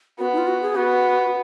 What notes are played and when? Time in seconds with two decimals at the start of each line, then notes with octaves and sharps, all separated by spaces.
0.19 B3 F#4
0.33 D#4
0.38 F4
0.47 F#4
0.62 G#4
0.76 B3 F#4